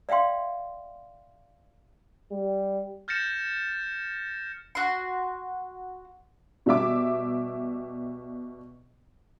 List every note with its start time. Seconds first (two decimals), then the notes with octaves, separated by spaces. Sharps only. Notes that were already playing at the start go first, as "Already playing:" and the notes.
0.09 D5 E5 F5 G5 C6
2.32 G3
3.08 F6 G6 A6 A#6 C#7 E7
4.75 F#4 C6
6.66 B2 G3 E5 D6